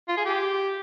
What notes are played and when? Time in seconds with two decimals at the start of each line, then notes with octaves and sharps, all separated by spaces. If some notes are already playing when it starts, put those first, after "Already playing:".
0.08 F4
0.17 G#4
0.26 G4